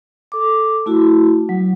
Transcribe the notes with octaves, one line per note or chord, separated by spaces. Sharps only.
A4 D6
A3 E4 F#4
F#3